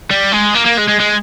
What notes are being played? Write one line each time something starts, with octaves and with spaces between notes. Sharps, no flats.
G3
G#3
A#3
A#3
G#3
G#3
G#3